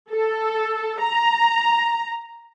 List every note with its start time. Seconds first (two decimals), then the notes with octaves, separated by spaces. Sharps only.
0.11 A4
1.01 A#5